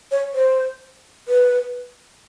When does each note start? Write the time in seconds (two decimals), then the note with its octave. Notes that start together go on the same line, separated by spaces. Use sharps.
0.12 C#5
0.34 C5
1.28 B4